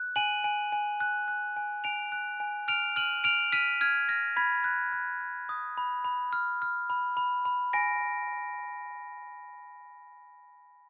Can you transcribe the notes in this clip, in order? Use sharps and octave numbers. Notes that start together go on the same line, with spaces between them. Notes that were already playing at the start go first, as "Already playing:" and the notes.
Already playing: F#6
G#5 D#7 F#7
G#5
G#5
F#6
F#6
G#5
G#5 D7 F7
F#6
G#5
F6 D7 F7
F6 D#7 F#7
F6 D7 F7
F6 B6 D#7
F6 G#6
F6 A#6
B5 G#6 B6
F#6
F#6
F#6
D#6
B5
B5
F6
F6
B5
B5
B5
G#5 A#6 D7